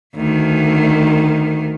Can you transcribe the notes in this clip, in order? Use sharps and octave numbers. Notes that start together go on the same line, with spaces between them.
D2 D#3